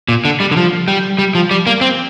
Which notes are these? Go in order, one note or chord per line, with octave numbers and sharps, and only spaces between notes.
A#2
D3
G3
D3
F3
G3
G3
F3
G3
A#3
C4